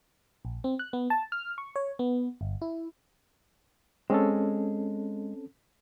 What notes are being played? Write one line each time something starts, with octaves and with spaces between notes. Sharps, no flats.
A#1
C4
F#6
B3
A5
F6
C#6
C#5
B3
G1
E4
G#3 C4 C#4 A4